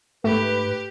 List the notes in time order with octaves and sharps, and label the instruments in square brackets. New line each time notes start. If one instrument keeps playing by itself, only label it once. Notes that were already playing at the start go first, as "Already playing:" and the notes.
[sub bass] G#2 [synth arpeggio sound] A3 [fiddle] G4 [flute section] B4